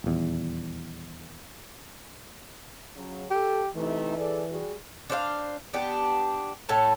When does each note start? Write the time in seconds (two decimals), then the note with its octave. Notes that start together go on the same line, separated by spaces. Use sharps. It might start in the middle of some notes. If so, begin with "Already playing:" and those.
0.04 D#1 E2
2.96 C#3 F#3
3.31 G4 A4
3.76 C3 E3 A3 D#4
4.17 G#4 A4 D5
4.50 G3 F#4 G#4
5.10 D4 C5 D5 F5
5.73 B3 D4 G4
6.69 A2 A3 C#5 A5